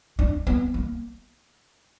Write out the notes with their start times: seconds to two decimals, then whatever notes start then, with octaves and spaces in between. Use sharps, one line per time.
0.19 D4
0.47 B3
0.74 A#3